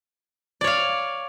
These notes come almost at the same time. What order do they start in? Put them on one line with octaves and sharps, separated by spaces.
D5 C#5 F5